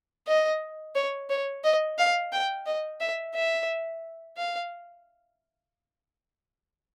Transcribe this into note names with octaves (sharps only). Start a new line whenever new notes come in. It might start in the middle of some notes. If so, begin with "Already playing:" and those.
D#5
C#5
C#5
D#5
F5
G5
D#5
E5
E5
F5